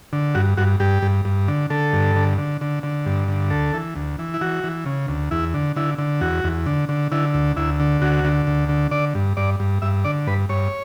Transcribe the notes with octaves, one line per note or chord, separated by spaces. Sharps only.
D3
G2 F#4
G2 F#4
G2 G4
G2
G2
D3
D3 A4
G2
D3
D3
D3
D3
G2
D3
D2 A4
E3
D2
E3
E4
E3 F#4
E3
C#3
D2
E2 E4
D3
D3 E4
D3
E2 F#4
E2
D3
D3
D3 E4
D2
D2 E4
D3
D2 F#4
D3
D2
D3
D3 D5
G2
G2 D5
G2
G2 E5
D3 D5
G2 B4
G2 C#5